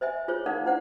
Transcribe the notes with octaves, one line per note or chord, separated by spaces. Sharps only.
C5 D#5 E5 G#5
F4 G#4 C5 C#5
D#4 A#4 D5 F5 F#5 D6
D4 E4 C5 F#5